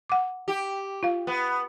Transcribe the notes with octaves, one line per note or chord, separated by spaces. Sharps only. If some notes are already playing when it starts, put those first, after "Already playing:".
F#5 D6
G4
F4 F5
B3